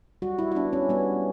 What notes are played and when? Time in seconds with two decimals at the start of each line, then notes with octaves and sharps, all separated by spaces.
0.22 G3 F#4
0.39 E4
0.52 E4
0.55 B3 D4
0.73 C#4
0.89 G3 B3